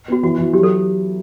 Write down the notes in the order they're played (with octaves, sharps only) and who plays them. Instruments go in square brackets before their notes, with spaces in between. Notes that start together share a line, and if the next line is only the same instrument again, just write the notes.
[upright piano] B3 [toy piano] F#4
[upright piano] E3 [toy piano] F#4
[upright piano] E3
[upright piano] F#3 [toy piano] G4
[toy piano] A4